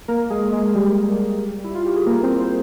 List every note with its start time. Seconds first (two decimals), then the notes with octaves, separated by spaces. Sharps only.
0.08 A#3 A#4
0.30 G#3 G#4
0.52 G#3 G#4
0.75 G3 G4
1.64 E4
1.75 F4
1.85 G4
1.96 G#4
2.06 A#3 A#4
2.23 C4 C5
2.39 C4 C5